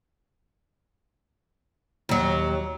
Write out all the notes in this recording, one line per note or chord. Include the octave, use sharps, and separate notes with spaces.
D#2 F#3